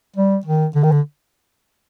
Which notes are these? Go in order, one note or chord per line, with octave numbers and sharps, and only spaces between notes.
G3
D#3
D3
D#3
D3